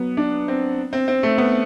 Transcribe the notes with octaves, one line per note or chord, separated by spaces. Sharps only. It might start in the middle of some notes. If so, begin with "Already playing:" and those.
Already playing: F#3 B3
D4
C4
C4
C4
A3
B3